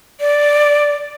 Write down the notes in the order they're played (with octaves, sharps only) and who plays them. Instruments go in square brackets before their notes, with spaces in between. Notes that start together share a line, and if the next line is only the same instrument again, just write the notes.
[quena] D5